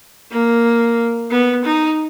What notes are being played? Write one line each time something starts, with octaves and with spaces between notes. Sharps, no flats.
A#3
B3
D#4